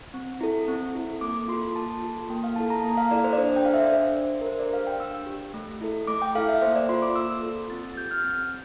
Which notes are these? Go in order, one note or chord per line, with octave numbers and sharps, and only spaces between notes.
C4
E4 A4
C4
E4 A4
A#3 D6
F4 C6
A4
A#3 A5
F4 A4
A#3 G5
F5
E4 A4 A5
A#5
A#3
F5
E4 A4 D5
C5
D5
D4 C5
G5
A4 F5
E5
D5
D4 C5
A4
A#4
D4 C5
D5
G4 F5
G5
D4 E6
G4
A3
E4 A4
A3 D6
G5
E4 A4 F5
E5
A#3 C5
D5
F4 A4 C6
D6
A#3 E6
F4 A4
C4 A6
A6
G4 G6
F6
C4